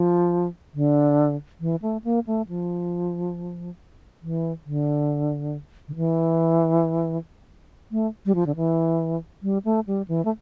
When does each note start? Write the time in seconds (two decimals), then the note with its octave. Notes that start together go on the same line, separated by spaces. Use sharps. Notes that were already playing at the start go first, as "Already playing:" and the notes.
Already playing: F3
0.74 D3
1.61 E3
1.82 A3
2.04 A#3
2.27 A3
2.49 F3
4.22 E3
4.66 D3
5.88 D3
5.96 E3
7.92 A3
8.26 G3
8.35 F3
8.46 D3
8.56 E3
9.43 G3
9.65 A3
9.87 G3
10.08 E3
10.25 A3